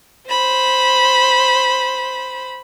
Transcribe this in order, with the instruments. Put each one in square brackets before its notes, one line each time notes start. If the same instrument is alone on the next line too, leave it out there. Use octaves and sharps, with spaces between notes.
[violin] C5 B5